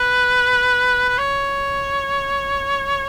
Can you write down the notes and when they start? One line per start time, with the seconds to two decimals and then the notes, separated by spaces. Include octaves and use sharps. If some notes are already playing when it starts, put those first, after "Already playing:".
Already playing: B4
1.09 B4
1.18 C#5